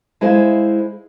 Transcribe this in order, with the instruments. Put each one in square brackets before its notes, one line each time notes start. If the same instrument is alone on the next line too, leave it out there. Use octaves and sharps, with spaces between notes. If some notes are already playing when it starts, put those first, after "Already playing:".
[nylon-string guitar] G#3 E4 G#4 C5 F5